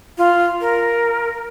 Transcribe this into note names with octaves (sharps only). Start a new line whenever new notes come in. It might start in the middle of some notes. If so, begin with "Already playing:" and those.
F4
A#4